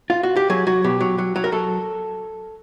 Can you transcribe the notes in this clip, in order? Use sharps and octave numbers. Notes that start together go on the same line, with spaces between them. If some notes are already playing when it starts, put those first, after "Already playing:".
F4
F#4
G4
F#3 G#4
F#3 F#4
B2 G4
F#3
F#3
F#3
A#4
F#3 A4